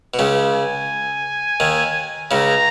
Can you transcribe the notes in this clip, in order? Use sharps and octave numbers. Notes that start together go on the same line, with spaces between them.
B2
C#2 C#3
G#5
D#2 D#3
C#2 C#3 A#5